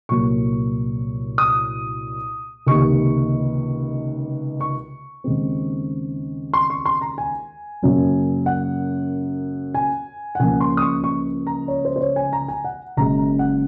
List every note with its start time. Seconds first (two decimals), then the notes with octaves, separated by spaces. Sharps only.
0.09 C2 A#2 F#3 A#3 C#6
1.38 D#6
2.67 C#2 C3 D#3 A#3 C#6
4.61 C#6
5.24 D#2 C#3 G#3 C4
6.53 C6
6.70 C#6
6.86 C6
7.01 A#5
7.18 G#5
7.83 F#2 C#3 F#3 A#3
8.46 F#5
9.74 G#5
10.35 F#5
10.39 C#2 C#3 F3 A#3 G#5
10.61 C6
10.77 D#6
10.82 C#6
11.04 C#6
11.47 A#5
11.68 C#5
11.85 C5
11.96 C5
12.01 C#5
12.16 G#5
12.33 A#5
12.48 G#5
12.64 F#5
12.97 F#1 F#2 C#3 G#3 A#5
13.39 F#5